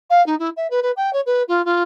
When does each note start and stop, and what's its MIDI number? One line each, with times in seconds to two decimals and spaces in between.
0.10 0.24 77
0.26 0.35 63
0.39 0.49 64
0.56 0.67 76
0.70 0.80 71
0.82 0.91 71
0.96 1.10 79
1.13 1.20 73
1.26 1.43 71
1.48 1.64 65
1.65 1.83 65